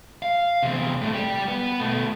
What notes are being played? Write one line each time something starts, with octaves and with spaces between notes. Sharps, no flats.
F5
E2 C3
A2 A3
G3 G4
B3 B4
B2 A3